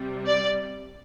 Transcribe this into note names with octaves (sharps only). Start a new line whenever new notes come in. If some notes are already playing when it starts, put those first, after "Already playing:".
Already playing: C3 G3
D5